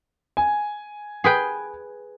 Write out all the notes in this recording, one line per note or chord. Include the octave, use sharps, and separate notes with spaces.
G#5
G#4 B4 G5